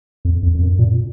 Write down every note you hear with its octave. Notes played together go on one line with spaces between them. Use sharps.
F2
F2
F2
F#2
A#2